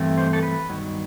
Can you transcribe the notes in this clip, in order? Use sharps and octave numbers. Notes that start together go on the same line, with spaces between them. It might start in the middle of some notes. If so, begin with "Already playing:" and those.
Already playing: G2 E3 A3 C4
C5
A4
B4
G2 D#3 F#3 B3